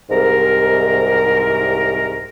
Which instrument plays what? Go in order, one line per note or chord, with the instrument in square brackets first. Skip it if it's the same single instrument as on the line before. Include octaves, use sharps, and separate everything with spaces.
[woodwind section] C2 G#2 A#4